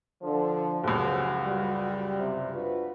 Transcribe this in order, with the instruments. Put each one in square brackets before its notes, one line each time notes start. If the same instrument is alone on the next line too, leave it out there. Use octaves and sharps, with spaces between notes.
[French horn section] D3 [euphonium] F3
[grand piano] F#1 C#2 [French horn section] C#3 F3 G4 [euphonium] F#4
[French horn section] G3
[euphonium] C3
[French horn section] D4 F#4 B4 [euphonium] F4